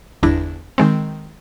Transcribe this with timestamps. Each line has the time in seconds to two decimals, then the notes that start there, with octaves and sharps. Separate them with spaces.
0.23 G1 E2 D4 E4 A#6
0.78 D#3 G#3 C4